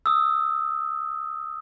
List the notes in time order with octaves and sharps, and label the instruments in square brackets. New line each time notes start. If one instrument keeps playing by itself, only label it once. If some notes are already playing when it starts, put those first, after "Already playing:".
[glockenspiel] D#6 E6